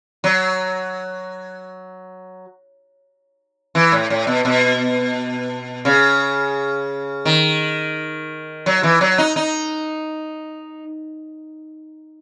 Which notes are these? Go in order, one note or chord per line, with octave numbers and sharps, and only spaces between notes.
F#3
E3
A2
A2
B2
B2
C#3
D#3
F#3
E3
F#3
D#4
D#4